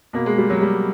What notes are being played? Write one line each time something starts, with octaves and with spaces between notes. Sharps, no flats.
B2 A#3
G#3
G3
F#3
G3